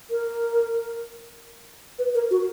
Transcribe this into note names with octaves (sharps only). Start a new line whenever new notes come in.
A#4
B4
A#4
F#4